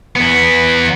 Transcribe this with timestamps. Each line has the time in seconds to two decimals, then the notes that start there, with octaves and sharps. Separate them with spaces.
0.16 E2 B3